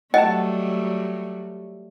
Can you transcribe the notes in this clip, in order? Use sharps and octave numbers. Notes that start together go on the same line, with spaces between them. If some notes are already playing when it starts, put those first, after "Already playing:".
F#3 G3 A3 D#5 F#5 G5 A5